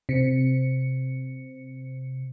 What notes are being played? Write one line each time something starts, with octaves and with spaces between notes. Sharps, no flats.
C3 C#7